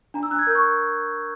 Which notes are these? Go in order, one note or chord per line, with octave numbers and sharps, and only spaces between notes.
D4 A#5
E6
D4 F#6
G#6
A#4 G6
C#6